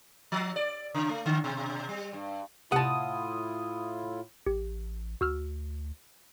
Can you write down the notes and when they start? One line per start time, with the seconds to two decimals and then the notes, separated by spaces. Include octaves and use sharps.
0.32 F3
0.56 D5
0.95 C#3
1.10 A3
1.26 D3
1.44 B2
1.89 G3
2.13 G2
2.72 A2 C3 E4 F4 F#5 A5 D#6
4.46 A1 G4
5.21 D2 F#4 E6 F6